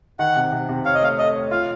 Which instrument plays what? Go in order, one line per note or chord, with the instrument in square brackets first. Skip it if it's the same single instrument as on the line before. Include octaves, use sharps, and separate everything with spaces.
[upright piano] D#3 [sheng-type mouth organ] F#5
[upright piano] C3
C3
C3
[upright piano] C#5 [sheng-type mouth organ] F5
[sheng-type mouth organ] D#5
[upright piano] A3 [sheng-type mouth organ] F5
[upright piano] A4 [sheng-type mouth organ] D#5
[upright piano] C#5
[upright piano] F4 [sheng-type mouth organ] F5